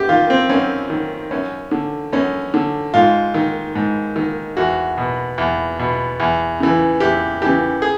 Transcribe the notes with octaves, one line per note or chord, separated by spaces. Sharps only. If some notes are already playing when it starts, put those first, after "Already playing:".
Already playing: F#2 G4
D#3 F4
C4
F#2 C#4
D#3
F#2 C#4
D3
F#2 C#4
D3
G#2 F4
D#3
G#2
D#3
E2 F#4
B2
E2
B2
E2
C#3 E3
E2 G4
C#3 E3 G4
G#4